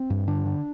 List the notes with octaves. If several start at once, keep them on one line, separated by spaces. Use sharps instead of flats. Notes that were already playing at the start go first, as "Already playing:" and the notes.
Already playing: C4
G2
D3 D4
D3